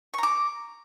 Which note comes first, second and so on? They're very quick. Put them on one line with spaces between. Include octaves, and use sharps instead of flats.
C#6 A#5 D6